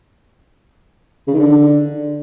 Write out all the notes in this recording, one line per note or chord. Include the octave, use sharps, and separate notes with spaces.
C#3
D#3
D3